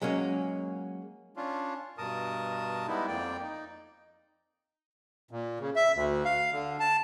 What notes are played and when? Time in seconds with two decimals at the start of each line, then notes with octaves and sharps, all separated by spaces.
0.02 F#3 G#3 A#3 C#4
1.37 C#4 D4 F4
1.98 G2 B2 A#4 A5 D#6
2.88 G3 G#3 B3 D#4 E4
3.08 F2 A#3 D5 G5
3.43 D#4
5.31 A#2
5.60 C#3
5.76 E5
5.95 D2
6.25 F5
6.52 D3
6.80 A5